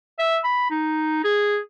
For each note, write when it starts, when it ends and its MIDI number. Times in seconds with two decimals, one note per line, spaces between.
0.19 0.38 76
0.44 0.68 83
0.70 1.19 63
1.24 1.58 68